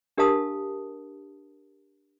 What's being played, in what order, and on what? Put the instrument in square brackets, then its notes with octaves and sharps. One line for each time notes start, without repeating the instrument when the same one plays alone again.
[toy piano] D4 G4 A#4 F5 A5 D#6